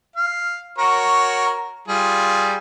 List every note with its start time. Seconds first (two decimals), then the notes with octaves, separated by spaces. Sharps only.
0.16 F5
0.78 F#4 A#4 C#5
1.88 G3 F4 G#4